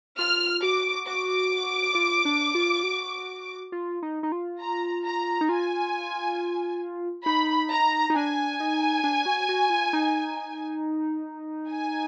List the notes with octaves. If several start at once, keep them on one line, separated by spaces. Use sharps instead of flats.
F4 F6
F#4 D6
F#4 D6
F4
D4
F4
F#4
F4
D#4
D#4
F4
A#5
A#5
D#4
F4 G#5
D#4 B5
A#5
D#4
D4 G#5
D#4
D4
F#4
F#4
F4
D#4
G#5